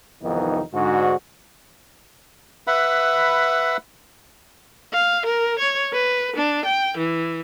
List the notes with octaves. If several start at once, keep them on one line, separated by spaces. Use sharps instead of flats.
C2 F2 D#3 E3 B3 D#4
G#2 D3 F#4
B4 E5 F#5 B5
F5
A#4
C#5
B4
D4
G5
E3